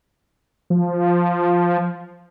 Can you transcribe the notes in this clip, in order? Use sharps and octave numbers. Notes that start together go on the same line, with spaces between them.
F3